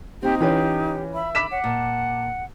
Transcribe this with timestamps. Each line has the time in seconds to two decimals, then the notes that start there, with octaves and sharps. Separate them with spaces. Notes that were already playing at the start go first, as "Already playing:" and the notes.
0.23 A#3 C4 D#4 G4
0.40 E3 C#4 F4 G4 B4 F5
1.14 E5 B5
1.35 B5 D6 B6 E7
1.51 C#5 F#5
1.64 A#2 A5